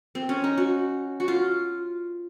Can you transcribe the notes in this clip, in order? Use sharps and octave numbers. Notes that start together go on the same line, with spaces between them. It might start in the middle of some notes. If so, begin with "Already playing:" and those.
C4
C#4
D#4
F#4
F#4
F4